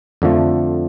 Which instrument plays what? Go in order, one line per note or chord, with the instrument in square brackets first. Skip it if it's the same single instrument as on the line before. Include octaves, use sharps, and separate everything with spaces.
[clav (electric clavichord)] F2 D3 F3 A3